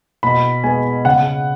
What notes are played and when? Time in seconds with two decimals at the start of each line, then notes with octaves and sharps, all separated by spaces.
0.23 B2 B5
0.64 G#3 B3 G#5
1.05 C#3 F#5